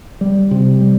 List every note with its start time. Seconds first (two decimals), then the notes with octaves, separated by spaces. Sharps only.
0.21 G3
0.51 C3
0.81 G3